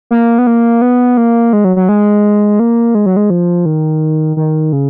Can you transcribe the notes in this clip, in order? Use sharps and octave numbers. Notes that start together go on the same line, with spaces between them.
A#3
B3
A#3
B3
A#3
G#3
F#3
F#3
G#3
A#3
G#3
F#3
G#3
F3
D#3
D#3
C#3